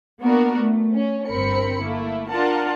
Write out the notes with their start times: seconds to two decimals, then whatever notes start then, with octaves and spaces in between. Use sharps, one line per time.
0.21 A#3 B3 D4 F#4 A#4
0.58 A3
0.93 C#4
1.28 G1 C4 A#4 B5 C#7
1.81 A3 A#3 E4
2.29 D4 F4 A#4 F#5 A5